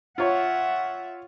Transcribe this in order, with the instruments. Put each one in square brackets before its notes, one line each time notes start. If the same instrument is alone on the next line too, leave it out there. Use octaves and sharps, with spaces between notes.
[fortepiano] F4 C#5 [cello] E5 F#5